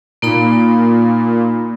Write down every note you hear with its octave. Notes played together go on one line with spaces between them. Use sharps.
A#2 A#3 D#4 B5